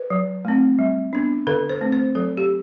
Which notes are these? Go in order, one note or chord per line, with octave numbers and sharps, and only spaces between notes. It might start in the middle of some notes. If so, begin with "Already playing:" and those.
Already playing: B4
F#3
A3 C4
G3
B3 D4
D3 A4
C5
A3 C4
C5
F#3 A4
G4